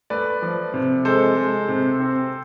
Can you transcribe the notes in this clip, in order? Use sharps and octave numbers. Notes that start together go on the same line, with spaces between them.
A3 B4 D5
F3
C3
G#3 A4 C5
G#3
C3
C4